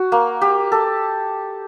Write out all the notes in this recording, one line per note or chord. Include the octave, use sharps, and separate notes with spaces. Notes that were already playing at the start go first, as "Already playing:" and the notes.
Already playing: F#4
A#3
G4
A4